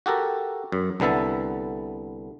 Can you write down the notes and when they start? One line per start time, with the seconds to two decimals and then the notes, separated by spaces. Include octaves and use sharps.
0.06 F#4 G4 A4 A#4
0.72 F#2
1.00 C2 D3 B3 E5 A5